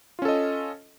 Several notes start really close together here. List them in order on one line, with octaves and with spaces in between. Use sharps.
F4 C#4 A4 D#5